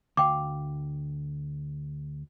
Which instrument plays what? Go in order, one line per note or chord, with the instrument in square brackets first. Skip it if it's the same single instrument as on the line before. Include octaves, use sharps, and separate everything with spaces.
[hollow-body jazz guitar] D2 F5 [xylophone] G5 D6